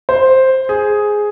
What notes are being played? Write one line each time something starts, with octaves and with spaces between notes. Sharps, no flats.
C5
G#4